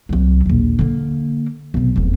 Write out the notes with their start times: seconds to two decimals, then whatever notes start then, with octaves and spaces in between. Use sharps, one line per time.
0.09 C2 F#3
0.46 A#1 D#2
0.79 D3 A#3
1.74 B1 C3
1.96 F1 E2